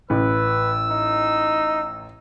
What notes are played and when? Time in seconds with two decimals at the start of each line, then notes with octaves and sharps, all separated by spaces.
0.10 A1 B4 E6
0.91 D#4